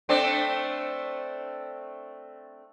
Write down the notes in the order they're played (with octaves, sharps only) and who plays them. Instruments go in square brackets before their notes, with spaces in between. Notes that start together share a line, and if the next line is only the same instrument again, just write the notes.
[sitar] A3 C4 D4